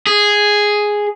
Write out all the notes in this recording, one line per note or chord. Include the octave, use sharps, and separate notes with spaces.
G#4